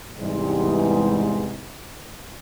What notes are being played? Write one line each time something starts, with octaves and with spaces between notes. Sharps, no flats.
E2 G#2 C3 E3 G3 G#3